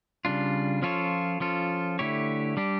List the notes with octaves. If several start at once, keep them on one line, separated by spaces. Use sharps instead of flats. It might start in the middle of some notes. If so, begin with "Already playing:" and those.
C#3 G3 D4 F4
F3 C#4 F4 A4 C#5
F3 C#4 F4 A4
D3 A3 E4 G4 C#5
G3 D4 G4